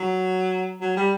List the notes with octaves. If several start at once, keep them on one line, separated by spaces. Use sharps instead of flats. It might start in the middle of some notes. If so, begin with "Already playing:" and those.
Already playing: F#3
F#3
G3